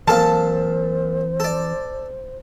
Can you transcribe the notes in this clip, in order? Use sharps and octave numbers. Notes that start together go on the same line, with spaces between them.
A#2 E3 F#3 C4 A4 C5 F5 A5
A4 D5